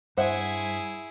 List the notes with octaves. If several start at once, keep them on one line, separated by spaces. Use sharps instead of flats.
G2 E4 G#4 C5 E5 F#5